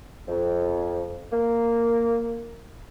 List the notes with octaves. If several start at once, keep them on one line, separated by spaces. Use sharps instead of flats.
F2
A#3